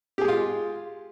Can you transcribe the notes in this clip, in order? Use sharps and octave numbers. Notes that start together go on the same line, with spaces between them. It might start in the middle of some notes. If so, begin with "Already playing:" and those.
G#3 F4 G4 G#4